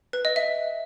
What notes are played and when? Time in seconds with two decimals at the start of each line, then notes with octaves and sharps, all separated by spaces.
0.13 B4
0.25 D#5
0.36 E5